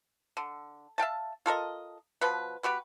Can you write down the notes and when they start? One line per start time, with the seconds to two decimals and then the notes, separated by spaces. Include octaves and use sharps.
0.37 D3
0.98 E5 F5 G5 A5
1.46 F4 A4 A#4 D#5
2.21 B2 F3 B4
2.63 B3 F#4 G4 B4